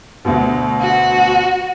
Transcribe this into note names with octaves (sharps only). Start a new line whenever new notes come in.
D2 B2
F#4